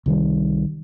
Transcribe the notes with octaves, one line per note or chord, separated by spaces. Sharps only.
C2 D#3 G3